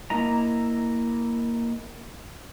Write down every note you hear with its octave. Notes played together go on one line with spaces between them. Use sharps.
A#3 E4 D#5 A#5